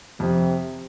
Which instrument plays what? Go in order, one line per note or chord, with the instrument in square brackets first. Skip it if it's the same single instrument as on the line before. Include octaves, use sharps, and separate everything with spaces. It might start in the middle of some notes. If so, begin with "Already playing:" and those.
[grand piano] F2 [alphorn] C3